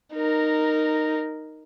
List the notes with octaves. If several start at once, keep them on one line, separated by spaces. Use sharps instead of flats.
D#4 A#4